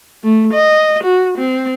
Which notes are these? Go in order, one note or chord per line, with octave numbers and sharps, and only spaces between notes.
A3
D#5
F#4
C4